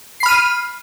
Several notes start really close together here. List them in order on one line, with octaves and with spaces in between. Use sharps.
C7 B5 F6 D#7